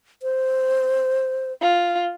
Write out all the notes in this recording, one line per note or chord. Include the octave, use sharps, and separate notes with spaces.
C5
F4